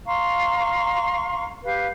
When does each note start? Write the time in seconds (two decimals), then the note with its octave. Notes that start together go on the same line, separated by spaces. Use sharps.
0.06 F5 A#5 C6 C#6
1.63 G4 B4 F5